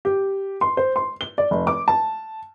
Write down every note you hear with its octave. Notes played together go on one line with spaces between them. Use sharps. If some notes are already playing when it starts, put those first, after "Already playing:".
G4
C6
C5
C6
G7
D5
F1
D6
A5